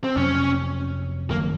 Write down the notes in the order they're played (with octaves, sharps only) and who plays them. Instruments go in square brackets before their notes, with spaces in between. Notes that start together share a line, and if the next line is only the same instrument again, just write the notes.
[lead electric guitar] C4
[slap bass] F2 C3 F#3 [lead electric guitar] C#4
[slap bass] F#1 F2 D#3 F#3 [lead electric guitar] A#3